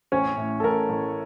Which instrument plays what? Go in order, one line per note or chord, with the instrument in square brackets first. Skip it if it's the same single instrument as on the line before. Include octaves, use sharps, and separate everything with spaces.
[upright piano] A1 C#4 C#5
A2
A4
A1 A#4
A1